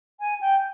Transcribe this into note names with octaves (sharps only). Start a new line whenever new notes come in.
G#5
G5